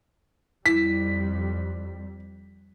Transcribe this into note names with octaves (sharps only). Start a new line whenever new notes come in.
F2 G3 E4 B6